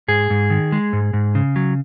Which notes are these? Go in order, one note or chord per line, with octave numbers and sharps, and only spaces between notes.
G#2 G#4
G#2
D#3
G#3
G#2
G#2
C#3
F#3